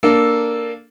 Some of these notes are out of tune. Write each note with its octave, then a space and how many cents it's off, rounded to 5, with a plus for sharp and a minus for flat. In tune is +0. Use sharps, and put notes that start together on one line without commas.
A#3 +0 D4 +0 A4 -5